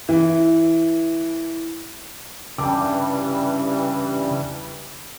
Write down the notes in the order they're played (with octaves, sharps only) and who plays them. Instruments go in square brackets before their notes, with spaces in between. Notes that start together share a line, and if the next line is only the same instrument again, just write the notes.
[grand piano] E3
[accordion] G2 E3 G3 [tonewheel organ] C#3 [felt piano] G5 A5 D6